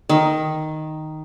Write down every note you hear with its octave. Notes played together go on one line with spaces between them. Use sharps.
D#3